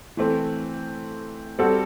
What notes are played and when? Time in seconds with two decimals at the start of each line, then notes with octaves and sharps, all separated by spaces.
0.17 E3 A3 C4
1.59 G3 C4 F#4 A4